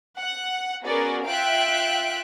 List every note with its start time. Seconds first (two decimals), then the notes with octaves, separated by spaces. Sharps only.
0.17 F#5
0.84 B3 C#4 F#4 G#4 A#4 D5
1.25 F4 E5 F5 G5 F#6 D7